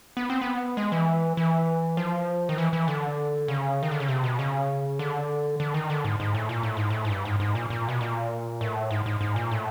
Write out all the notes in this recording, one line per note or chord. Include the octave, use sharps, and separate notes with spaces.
B3
C4
B3
G#3
E3
E3
F3
D#3
E3
E3
D3
C#3
D#3
D3
C#3
C3
B2
C#3
D3
D3
D#3
D3
G#2
G#2
A2
A#2
A2
G#2
A2
G#2
G2
G#2
G#2
A#2
A#2
B2
A#2
A2
G#2
G#2
G#2
A#2
A2